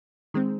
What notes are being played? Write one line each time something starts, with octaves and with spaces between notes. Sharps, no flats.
D#3 G#3 C4